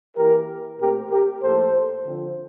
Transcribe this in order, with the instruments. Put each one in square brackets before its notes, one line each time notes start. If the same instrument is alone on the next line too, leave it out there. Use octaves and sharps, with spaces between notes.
[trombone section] E3 A#3 G4 A#4
A#2 A3 C4 G4 A#4
G4 A#4
A2 F3 A#3 A4 C5
D3 F3 C4